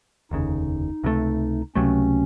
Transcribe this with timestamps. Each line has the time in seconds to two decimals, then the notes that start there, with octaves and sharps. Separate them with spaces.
0.31 F1 D#2 C#3 D#4
1.04 C#2 C3 F#3 A3
1.75 C#2 C3 F#3 A3 C#4